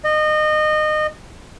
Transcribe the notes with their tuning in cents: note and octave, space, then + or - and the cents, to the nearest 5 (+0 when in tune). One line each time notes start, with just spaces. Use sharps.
D#5 -25